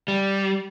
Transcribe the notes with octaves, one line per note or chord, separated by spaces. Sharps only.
G3